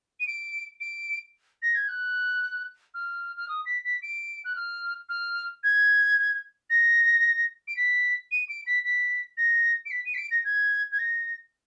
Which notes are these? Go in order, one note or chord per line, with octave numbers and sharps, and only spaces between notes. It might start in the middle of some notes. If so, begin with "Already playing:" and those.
D#7
D7
D7
A#6
G#6
F#6
F6
F6
D#6
B6
B6
D7
F#6
F6
F6
G#6
A#6
D7
B6
D#7
D7
B6
B6
A#6
D7
B6
D#7
B6
D7
A#6
G#6
G#6
A#6